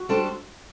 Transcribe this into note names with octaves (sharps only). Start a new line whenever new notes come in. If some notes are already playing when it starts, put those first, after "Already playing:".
Already playing: F#4
G3 D4 A4 C5